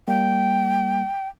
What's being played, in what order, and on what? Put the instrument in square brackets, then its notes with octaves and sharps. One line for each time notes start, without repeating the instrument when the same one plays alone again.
[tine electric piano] G3 A#3 [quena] G5